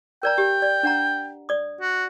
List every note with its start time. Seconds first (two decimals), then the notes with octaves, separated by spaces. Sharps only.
0.23 A#4 D5 G5 A#5
0.38 G4
0.62 D5
0.83 D4 F#5 A#5
1.49 D5 D#6
1.81 F#4